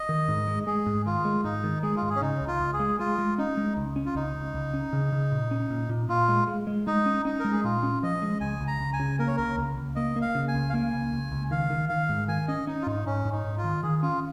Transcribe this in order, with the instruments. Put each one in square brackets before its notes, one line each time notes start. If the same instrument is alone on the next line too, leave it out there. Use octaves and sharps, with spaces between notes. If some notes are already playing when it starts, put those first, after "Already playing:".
Already playing: [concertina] D#5
[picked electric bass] D#3
G#2
G#3
[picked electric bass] G#3 [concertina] G#4
[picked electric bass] G#2
[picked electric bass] D#3 [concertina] F4
[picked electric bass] G#3
[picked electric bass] G#2 [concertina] D#4
[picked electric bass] D#3
[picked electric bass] G#3 [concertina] G#4
[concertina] F4
[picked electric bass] G#2
[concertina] G#4
C#4
[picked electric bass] C#3 [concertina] D#4
[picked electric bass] C#2
[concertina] F4
[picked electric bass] C#2
[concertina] G#4
[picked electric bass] G#3
[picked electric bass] G#3 [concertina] F4
[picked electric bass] G#3
[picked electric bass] C#4 [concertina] D#4
[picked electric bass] G#3
C#2
C#4
[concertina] F4
[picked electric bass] C#2 [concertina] D#4
[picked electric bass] C#2
C#2
C#4
C#3
C#3
A#2
C#4
A#2
A#2
[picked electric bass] A#2 [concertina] F4
[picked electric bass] G#3
G#3
G#3
[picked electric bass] G#3 [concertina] D#4
[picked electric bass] C#4
[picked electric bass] C#4 [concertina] D#4
[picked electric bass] G#3 [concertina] A#4
[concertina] G#4
[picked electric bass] A#2 [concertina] F4
[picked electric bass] C#4
[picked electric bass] F3 [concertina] D#5
[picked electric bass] G#3
[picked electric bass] C#2 [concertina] G#5
[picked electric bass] C#2
[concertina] A#5
[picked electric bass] C#2
[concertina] G#5
[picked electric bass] C#3
[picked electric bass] A#3 [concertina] A#4
[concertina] C#5
[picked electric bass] C#2 [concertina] A#4
[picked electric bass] C#2
C#2
[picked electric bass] A#3 [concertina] D#5
[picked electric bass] A#3
[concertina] F5
[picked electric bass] C#3
[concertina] G#5
[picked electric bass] C#2
[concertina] F5
[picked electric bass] A#3 [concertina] G#5
[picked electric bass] C#2
C#2
C#2
[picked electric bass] D#3 [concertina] F5
[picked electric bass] D#3
[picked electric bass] D#3 [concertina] F5
[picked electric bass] G#2
[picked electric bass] D#3 [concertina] G#5
[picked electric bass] C#4 [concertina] D#5
[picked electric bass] C#4 [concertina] D#4
[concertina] F4
[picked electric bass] G#2 [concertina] D#4
[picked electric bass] G#2 [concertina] C#4
[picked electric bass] G#2
[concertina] D#4
[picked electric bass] G#2
[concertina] F4
[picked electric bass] D#3
[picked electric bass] D#3 [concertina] G#4
[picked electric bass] C#4 [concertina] F4